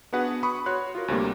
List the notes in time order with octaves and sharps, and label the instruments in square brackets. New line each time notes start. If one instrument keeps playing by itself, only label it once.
[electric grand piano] B3 D4 F#4 G#4 B4 F#5
B5 C#6 D#6
F#4 C#5 C6 F#6
F4 F#4 A#4
D2 C3 G3 A#3